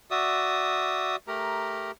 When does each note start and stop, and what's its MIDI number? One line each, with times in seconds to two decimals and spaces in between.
0.11 1.16 66
0.11 1.16 74
0.11 1.16 76
0.11 1.16 87
1.28 1.91 57
1.28 1.91 67
1.28 1.91 70
1.28 1.91 82